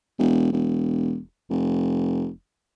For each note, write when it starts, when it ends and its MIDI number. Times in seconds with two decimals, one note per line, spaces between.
0.19 0.51 28
0.52 1.18 28
1.50 2.29 29